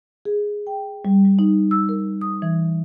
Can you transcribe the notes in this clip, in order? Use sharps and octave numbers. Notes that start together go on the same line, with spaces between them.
G#4
G5
G3
G3
D#4
E6
A#4
D#6
E3